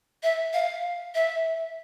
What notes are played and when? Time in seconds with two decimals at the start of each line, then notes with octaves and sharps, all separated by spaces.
0.23 E5
0.53 F5
1.15 E5